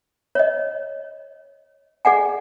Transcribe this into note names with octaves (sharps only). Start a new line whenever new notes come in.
C#5 D#5
G#4 D5 F#5 G#5